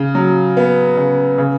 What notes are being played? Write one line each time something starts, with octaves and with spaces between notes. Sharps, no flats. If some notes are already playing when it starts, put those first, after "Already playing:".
Already playing: C#3
F#3
B3
C#3
C#3